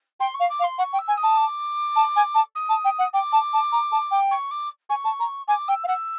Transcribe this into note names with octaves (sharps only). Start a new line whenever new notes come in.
G5 C6
C#6
F5
D6
F5
C6
F#5 C#6
G5
E6
G#5
D#6
A5
D6
A5
G#5
A5
D#6
A5
G5
F#5
G5 D6
A5
A5
A#5
A5
G5
C#6
D6
G#5 C#6
A5
A#5
G#5 D6
G5 E6
F5
F#5 E6